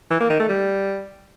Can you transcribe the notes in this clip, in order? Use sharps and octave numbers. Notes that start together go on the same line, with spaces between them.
E3
A#3
D#3
A3
G3